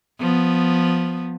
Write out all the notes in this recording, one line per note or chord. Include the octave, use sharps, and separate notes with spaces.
F3 B3